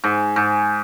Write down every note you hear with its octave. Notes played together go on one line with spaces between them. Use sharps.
G#2
G#2